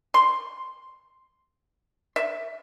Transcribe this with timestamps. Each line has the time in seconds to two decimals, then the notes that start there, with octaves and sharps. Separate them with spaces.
0.14 C6
2.16 E5